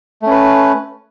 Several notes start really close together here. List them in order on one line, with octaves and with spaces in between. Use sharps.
A3 C#4 B4